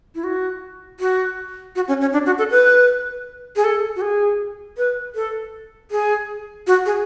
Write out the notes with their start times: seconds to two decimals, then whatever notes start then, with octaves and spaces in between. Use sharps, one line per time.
0.15 E4
0.24 F#4
1.00 F#4
1.75 F#4
1.88 C#4
2.01 C#4
2.13 D4
2.26 F#4
2.38 A4
2.51 B4
3.56 G#4
3.64 A4
3.96 F#4
4.01 G#4
4.77 B4
5.15 A4
5.91 G#4
6.67 F#4
6.86 G#4